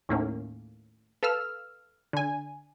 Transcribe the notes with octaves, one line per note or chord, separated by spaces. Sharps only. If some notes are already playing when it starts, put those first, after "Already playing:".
D#2 A2 A#3 C#4
A4 B4 F5 E6 F6
D3 G#5